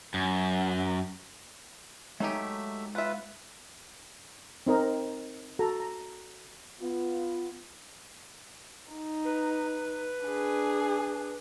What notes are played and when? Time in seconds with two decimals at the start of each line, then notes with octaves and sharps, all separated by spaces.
0.14 F#2
2.20 F#3 G#3 A3 D#4 G4 E5 G#5
2.95 B3 F4 B4 E5
4.67 C4 D#4 A#4 D#5
5.59 F#4 A4 A#5
5.80 A#5
6.81 B3 F4
8.91 D#4
9.25 B4
10.25 D4 G#4